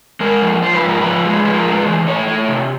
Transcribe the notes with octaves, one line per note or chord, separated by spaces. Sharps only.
G#3 A#4
F3
F3 C5
B4
G#2
A#4
F3 B4
G#3
F3 B4
A#4
G#3
B4
E3 C5
A3 C#5
A3
C3